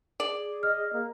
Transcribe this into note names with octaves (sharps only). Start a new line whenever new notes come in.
G#4 D5
D#5 F6
A#3